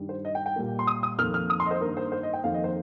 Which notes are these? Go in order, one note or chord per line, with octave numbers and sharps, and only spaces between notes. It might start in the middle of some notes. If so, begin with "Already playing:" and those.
Already playing: G2 D#3 G3
C5
D#5
G5
G5
A#2 G3 A#3
C6
D#6
D#6
F2 D#3 A#3 F6
F6
D#6
C6
D#5
C5
G2 D#3 A#3 A#4
C5
C5
D#5
G5
F2 D#3 A#3 F5
D#5
C5